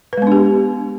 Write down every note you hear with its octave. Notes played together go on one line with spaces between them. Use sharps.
G#3 B3 D4 G4 B4